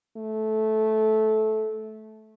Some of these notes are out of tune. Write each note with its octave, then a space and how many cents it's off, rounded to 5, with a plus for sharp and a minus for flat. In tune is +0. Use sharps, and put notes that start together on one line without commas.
A3 -15